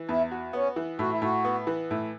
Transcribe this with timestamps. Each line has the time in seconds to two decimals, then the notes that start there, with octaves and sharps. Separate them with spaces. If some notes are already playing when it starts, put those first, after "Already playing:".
Already playing: E3
0.09 E2 E4
0.31 F#4
0.53 B3 C#4
0.76 E3
0.99 A2 F#4
1.10 E4
1.22 A2 F#4
1.44 B3
1.67 E3
1.91 A2